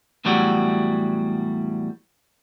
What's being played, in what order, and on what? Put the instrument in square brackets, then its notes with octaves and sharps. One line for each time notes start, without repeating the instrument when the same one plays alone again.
[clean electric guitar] E2 A2 F#3 G3 F#4